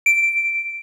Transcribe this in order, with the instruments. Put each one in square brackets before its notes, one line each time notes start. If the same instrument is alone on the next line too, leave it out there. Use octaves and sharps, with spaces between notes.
[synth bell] D7